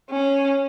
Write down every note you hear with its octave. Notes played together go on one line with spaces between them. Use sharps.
C#4